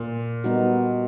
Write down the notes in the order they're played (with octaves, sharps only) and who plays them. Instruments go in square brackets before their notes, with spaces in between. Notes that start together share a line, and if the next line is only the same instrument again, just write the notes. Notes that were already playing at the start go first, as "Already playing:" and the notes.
Already playing: [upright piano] A#2
[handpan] G3 B3 D#4 F#4 A#4